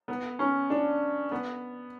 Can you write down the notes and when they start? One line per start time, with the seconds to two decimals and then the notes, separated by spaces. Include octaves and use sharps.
0.08 B3
0.39 C#4
0.70 D4
1.31 B3